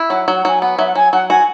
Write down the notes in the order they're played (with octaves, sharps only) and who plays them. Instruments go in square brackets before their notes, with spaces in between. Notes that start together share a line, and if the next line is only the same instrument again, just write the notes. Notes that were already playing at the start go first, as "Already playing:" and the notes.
Already playing: [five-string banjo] E4
[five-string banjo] F#3 [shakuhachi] F#5
[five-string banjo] F#3
[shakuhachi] F#5
[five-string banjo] F#3 [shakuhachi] G#5
[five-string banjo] B3 [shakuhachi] F#5
[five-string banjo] F#3 [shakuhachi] E5
[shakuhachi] F#5
[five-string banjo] F#3 [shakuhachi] G#5
[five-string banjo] F#3 [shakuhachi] F#5
[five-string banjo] F#4 [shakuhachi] G#5